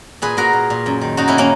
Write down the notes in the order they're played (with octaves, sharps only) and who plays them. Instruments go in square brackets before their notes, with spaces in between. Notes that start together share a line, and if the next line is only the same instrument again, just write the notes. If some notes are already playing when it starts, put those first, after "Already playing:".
[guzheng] A#2 G#4 B4
A#2 F#4 A#4
A#2
A#2
F#2
D#3
F#2 D#4 F#4
D#3 C#4 E4
A#3 C#4